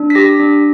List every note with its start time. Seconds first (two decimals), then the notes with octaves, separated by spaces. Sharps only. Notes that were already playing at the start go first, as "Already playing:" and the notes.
Already playing: D4
0.10 B6
0.15 G4 A#6
0.40 D4